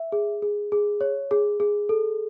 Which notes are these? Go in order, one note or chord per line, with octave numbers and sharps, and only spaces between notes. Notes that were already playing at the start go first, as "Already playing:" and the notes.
Already playing: E5
G#4
G#4
G#4
C#5
G#4
G#4
A4